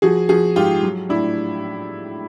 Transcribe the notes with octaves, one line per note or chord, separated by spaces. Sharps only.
F3 F#4 G#4
F3 F#4 G#4
G#2 F4 G4
F#3
A2 D4 E4